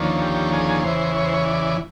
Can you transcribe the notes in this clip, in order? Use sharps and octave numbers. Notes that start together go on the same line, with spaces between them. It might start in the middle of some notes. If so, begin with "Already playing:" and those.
Already playing: D#2 D3 F3 A#3 C#4
G4
G#4
E2 C#3 E3 C5
C#5
C5
C#5
D5